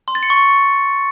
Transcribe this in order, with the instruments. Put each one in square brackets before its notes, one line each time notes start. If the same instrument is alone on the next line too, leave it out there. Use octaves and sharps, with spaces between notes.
[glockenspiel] C6
A6
C#7
C#6